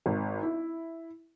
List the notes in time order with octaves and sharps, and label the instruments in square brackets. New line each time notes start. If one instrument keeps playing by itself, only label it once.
[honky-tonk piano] G#1
E4